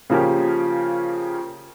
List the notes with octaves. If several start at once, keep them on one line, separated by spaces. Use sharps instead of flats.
C#3 F3 A#3 C#4 G4